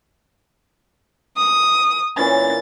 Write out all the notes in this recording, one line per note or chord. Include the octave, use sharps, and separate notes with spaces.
D#6
A#2 E3 C#4 A6